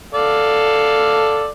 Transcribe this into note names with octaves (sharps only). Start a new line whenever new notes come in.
A4 D5 F5